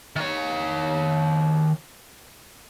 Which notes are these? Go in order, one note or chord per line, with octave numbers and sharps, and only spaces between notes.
D#3 C#5